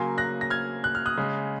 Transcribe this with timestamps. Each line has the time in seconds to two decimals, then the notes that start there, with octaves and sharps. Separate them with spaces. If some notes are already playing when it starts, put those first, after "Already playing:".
Already playing: C#3 F#3 A#3 G#5 C6
0.18 F#6 A#6
0.41 A#6
0.50 F6 G#6
0.84 F#6
0.95 F6
1.06 D#6 F#6
1.17 C#3 G#3